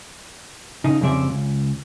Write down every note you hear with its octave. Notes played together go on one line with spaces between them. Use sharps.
C#3 D#4
F2 C#3 G3 C4 D5 E5
C#2